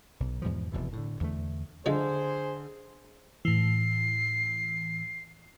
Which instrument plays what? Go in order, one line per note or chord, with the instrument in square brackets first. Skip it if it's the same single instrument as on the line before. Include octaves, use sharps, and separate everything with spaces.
[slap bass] B1
E2 G#2 B2 F3
F1 E2 B2 E3
A2 D3
E2 D3 A3
[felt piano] D3 [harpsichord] F3 G#3 [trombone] G#4 [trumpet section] C5
[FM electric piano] A2 E3 [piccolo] C7